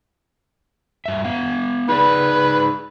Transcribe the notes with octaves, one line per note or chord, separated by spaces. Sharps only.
G2 E5
B3 F5
D#4 G#4 B4 D5